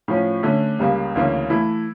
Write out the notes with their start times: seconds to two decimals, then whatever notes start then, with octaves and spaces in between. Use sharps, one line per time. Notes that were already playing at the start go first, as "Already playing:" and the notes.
0.08 A2 F3 C#4
0.43 D3 A3 C#4
0.79 C#2 C#3 G3 A#3
1.15 D2 C#3 E3 A#3 C#4
1.50 E3 A3 E4